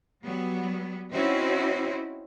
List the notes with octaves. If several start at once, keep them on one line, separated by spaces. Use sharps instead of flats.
F#3 G3 B3
C4 C#4 D#4 E4 F#4 C5